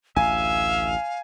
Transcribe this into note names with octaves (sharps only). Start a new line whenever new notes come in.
A1 D2 E5 F5 G#5